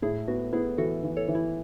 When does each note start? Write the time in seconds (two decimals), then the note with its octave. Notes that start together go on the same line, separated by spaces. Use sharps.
0.02 A2 E4 G#4
0.28 B3 F#4
0.53 B3 E4 G#4
0.78 E3 F#4 A4
1.03 E3
1.17 A4 C#5
1.28 E3
1.35 E4